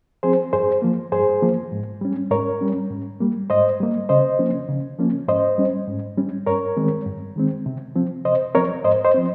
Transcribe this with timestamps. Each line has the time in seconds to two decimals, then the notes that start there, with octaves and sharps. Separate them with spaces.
0.23 F3 C4 G#4 C5
0.53 G2 G#4 C5
0.82 F3 A#3
1.12 G2 G#4 C5
1.42 F3 A#3
1.72 G#2
2.01 G3 C#4
2.31 G#2 A#4 C#5
2.61 G3 C#4
2.90 G#2
3.20 G3 A#3
3.50 G#2 C5 D#5
3.80 G3 A#3
4.09 C#3 C5 D#5
4.39 F3 A#3 C#4
4.69 C#3
4.98 F3 A#3 C#4
5.28 G#2 C5 D#5
5.58 G3 C#4
5.88 G#2
6.17 G3 C#4
6.46 G2 A#4 C#5
6.77 D#3 G#3 C4
7.07 G2
7.36 D#3 G#3 C4
7.66 C3
7.95 F3 C4
8.25 C3 C5 D#5
8.55 F3 C4 A#4 C#5
8.84 G#2 C5 D#5
9.05 C5 D#5
9.14 F3 C4